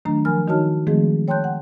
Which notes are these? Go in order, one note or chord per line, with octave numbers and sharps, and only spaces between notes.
D#3 F#3 A3 D4 A#5
F3 F#3 A#4 G#5 B5 F6
D#3 D#4 F#4 C#5 A5 F6
D#3 F3 G#3 A3 C4 G#4
C#5 G5 A5 C6 F#6 G6
F#5